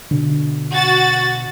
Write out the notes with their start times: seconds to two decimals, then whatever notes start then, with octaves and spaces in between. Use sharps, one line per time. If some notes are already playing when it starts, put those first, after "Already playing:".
0.11 B2 D3
0.72 F#4 A6